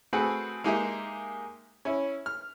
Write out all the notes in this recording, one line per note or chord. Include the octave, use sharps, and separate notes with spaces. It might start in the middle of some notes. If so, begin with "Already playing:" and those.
A3 C4 F#4 G#4 A4 B4
G#3 A#3 D#4 G4 G#4 E5
C#4 E4
F6